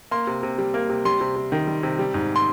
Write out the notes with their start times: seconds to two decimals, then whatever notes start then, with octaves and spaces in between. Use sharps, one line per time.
0.11 A#3 C6
0.27 C3
0.43 C3
0.58 G3
0.74 A#3
0.89 C3
1.05 G3 C6
1.21 C3
1.36 C3
1.52 D#3
1.67 G3
1.83 C3
1.99 G3
2.14 G#2
2.36 C6